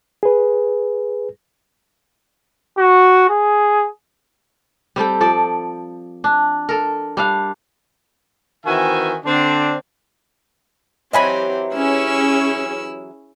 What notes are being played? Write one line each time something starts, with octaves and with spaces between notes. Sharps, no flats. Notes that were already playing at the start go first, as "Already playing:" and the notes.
G#4 B4
F#4
G#4
G3 C4 A4 G5
F3 A4 D5
D4
A4 A#4
G3 D4 F5
D#3 E3 C4 F#4 E5 G#5
D3 C4 D4
E3 F#3 C4 G4 D#5 G#5 B5
C#4 E4 G#4 E6